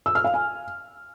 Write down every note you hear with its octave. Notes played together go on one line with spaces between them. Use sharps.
E6
F6
F5
G#5